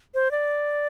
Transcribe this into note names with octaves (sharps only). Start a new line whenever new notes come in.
C5
D5